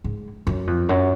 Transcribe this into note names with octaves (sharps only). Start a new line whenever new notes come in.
G#2
F#2
F2
F#2